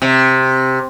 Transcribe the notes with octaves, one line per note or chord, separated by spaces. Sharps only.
C3